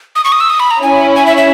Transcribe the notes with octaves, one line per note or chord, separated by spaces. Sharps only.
D#6
C#6
D#6
E6
D#6
B5
A#5
C#4 E4 G#5
G#5
E5
E5